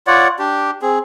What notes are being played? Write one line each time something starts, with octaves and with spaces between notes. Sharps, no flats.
F4 C#5 D5 F#5
D4 G4
C4 G#4